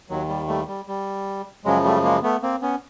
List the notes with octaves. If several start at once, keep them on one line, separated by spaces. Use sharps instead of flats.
D#2 D#3 F#3
G3
G3 A3
G3
G3
F#2 C#3 F3 F#3 G#3
G3 A3
G#3 A#3
A3 B3
A#3 C4
B3 C#4